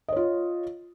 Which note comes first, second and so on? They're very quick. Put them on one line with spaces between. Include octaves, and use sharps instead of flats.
D#5 C#5 F4